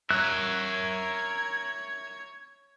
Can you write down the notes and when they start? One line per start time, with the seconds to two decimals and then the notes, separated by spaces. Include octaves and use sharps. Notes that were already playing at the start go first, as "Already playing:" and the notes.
0.11 A#4 C#5 E5 F#6 G#6